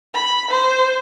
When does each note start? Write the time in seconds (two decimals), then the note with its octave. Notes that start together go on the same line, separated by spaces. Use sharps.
0.14 B5
0.50 C5